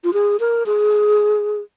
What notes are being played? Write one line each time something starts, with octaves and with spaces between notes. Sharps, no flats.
F4
G#4
A#4
G#4